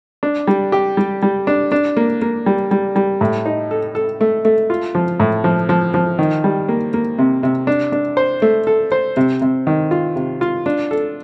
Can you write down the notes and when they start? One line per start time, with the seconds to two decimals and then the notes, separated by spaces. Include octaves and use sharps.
0.23 D4
0.47 G3
0.72 G4
0.97 G3
1.22 G3
1.47 D4
1.72 D4
1.97 A#3
2.22 A#3
2.46 G3
2.71 G3
2.96 G3
3.21 A2
3.46 D#4
3.71 A4
3.95 A4
4.21 A3
4.45 A3
4.70 F4
4.95 F3
5.20 A2
5.44 F3
5.69 F3
5.94 F3
6.19 D#3
6.44 G3
6.69 A#3
6.94 A#3
7.18 C3
7.43 C3
7.67 D4
7.92 D4
8.17 C5
8.42 A3
8.67 A4
8.92 C5
9.17 C3
9.41 C3
9.67 D#3
9.91 F4
10.16 C3
10.41 F4
10.66 D4
10.91 A4